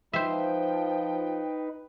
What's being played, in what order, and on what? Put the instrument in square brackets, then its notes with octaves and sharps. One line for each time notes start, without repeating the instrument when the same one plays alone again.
[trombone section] F3 [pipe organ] D#4 B4 [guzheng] C5 E5 [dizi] G5